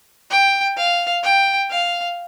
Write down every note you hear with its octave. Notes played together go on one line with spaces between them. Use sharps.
G5
F5
G5
F5